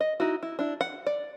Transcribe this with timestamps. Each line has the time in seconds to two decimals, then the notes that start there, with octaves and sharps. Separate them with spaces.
0.01 D#5
0.20 D#4 E4 F#4
0.43 E4
0.59 D4 E4
0.81 F#5
1.06 D5